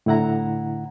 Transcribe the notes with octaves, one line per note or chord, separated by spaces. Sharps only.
A2 D3 E4 F#5 A#5